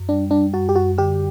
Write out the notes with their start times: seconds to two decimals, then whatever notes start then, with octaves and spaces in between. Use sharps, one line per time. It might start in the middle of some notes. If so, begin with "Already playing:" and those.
Already playing: F#2
0.09 G3 D4
0.31 G3 D4
0.53 F#2 F#4
0.69 G4
0.75 F#2 F#4
0.98 D3 G4